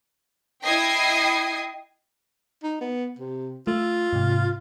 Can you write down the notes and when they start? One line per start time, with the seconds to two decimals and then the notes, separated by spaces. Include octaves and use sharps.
0.64 E4 D#5 G5 D#6 G#6 C7
2.63 D#4
2.81 B3
3.18 C3
3.67 A3 F4
4.13 G#2 C3